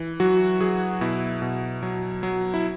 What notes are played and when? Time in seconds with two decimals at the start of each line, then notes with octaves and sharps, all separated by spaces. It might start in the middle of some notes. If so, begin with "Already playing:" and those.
Already playing: E3
0.20 F#3 F#4
0.61 F#3 G#4
1.01 B2 E4
1.42 B2
1.83 F#3
2.23 F#3
2.54 E4